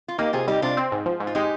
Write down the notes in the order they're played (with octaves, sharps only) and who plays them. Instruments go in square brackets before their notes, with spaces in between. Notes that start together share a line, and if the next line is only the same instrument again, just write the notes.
[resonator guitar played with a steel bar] F4
[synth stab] A#3 [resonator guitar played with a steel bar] D#4 G4
[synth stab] C3 [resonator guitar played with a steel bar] F4 G#4
[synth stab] G3 [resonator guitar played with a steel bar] D#4 G4
[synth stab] C3 [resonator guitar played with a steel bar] D4 F4
[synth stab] C4
G#2
F3
G#2
[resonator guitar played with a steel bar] F4
[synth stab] G#3 [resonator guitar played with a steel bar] D#4 G4